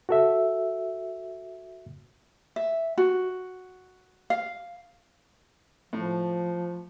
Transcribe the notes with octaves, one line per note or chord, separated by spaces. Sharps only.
F#4 A4 E5
E5
F#4
F5
A2 F3